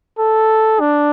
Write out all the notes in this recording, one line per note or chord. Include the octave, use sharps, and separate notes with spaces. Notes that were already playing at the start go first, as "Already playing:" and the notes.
A4
D4